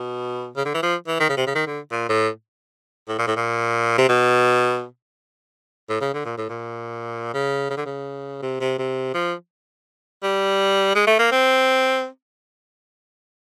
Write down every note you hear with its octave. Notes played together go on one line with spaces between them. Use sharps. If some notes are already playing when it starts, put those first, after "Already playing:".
Already playing: B2
C#3
D3
E3
F3
E3
D#3
C#3
C3
C#3
D#3
D3
A#2
A2
A2
A#2
A2
A#2
C3
B2
A2
C#3
D3
A#2
A2
A#2
C#3
C#3
D3
C#3
C3
C3
C3
F3
G3
G#3
A3
A#3
C4